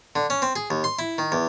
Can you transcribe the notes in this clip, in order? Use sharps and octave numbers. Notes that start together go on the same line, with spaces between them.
D3
C#4
C4
G#4
D#2
C6
E4
D#3
E2